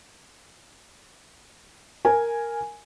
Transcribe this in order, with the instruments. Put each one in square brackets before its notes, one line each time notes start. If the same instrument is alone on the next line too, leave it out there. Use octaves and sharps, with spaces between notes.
[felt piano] A#4 G#5